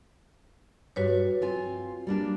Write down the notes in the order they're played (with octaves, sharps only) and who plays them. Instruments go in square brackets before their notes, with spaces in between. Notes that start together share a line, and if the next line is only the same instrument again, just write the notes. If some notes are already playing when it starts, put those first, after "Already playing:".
[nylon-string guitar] G2 G3 [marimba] F#4 B4 C#5
[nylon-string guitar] C4 F4 G#5
G3 A#3 D4